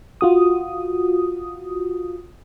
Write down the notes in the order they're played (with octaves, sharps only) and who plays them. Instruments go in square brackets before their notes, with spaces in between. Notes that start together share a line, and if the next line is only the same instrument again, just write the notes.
[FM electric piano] F4 F#4 D#6